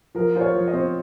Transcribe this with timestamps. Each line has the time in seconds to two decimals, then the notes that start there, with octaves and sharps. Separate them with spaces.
0.15 F3 A#4
0.35 F4 C5
0.41 C#5
0.54 F3
0.68 D#5
0.73 C4